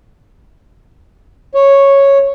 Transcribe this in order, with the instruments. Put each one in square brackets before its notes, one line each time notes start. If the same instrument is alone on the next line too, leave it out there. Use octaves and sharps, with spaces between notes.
[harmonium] C#5